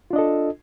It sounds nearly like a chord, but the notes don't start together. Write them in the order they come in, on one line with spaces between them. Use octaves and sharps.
F4 D4 D#5 A4